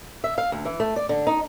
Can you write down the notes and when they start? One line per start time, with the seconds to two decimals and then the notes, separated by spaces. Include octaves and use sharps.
0.24 E5
0.38 F5
0.52 D2
0.65 E3
0.80 A3
0.96 D5
1.09 D3
1.27 D#4